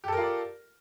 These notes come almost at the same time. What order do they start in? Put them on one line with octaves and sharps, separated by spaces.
G4 A4 A#4 F4 D5